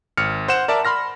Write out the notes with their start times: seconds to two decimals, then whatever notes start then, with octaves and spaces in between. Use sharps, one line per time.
0.17 G#1 F6 C#7
0.48 C5 F#5 E7
0.68 A#4 D5 E5 A5
0.85 B5 C6 F6 A#6